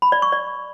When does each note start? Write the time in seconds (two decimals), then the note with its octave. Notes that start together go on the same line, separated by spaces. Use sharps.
0.02 B5
0.12 D5
0.22 C#6
0.32 D5